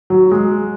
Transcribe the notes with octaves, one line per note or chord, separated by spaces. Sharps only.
F#3
G#3